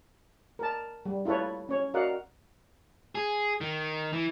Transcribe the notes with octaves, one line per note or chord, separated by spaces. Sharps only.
A#4 A5
G3
E4 F4 A4 B4 C#5
C#4 C#5
F#4 A#4 D5 D#5 F5 F#5
G#4
D#3
E3